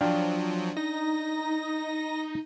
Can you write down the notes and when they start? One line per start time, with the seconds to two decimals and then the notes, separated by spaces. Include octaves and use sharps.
0.01 F3 F#3 D4 F5 G5
0.77 D#4 A#6